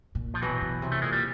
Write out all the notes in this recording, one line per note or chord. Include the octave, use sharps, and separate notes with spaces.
A#2
F3
B2 E3 F#3
B2
C3
A3
A#2 G#3
G3